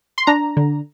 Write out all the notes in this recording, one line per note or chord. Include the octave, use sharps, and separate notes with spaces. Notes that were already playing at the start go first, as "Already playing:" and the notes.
C6
D4 A#5
D3